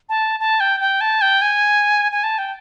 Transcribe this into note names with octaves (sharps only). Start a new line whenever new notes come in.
A5
A5
G5
G5
A5
G5
G#5
G#5
A5
G5